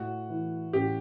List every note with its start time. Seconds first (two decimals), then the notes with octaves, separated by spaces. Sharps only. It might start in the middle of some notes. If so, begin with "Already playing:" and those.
Already playing: A2 F#4
0.29 E3
0.73 A1 G4